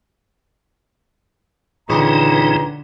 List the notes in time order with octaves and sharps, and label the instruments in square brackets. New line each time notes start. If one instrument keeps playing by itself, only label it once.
[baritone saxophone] C#2 [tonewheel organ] A#2 E3 D#4 [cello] D3 [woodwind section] B4 G5 A#5